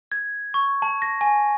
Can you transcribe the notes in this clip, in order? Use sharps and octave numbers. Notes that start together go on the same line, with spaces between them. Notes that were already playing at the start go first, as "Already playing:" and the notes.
G#6
C#6
A5
A#6
G#5